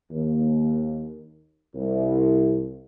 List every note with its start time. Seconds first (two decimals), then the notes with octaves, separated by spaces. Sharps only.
0.11 D#2
1.74 C2